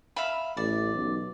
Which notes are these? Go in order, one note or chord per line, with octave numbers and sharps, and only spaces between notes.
E5 F5 B5
A1 D5
B1